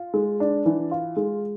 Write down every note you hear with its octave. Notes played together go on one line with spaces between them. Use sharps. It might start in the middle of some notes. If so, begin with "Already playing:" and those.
Already playing: F4
G#3
D4
E3
F4
G#3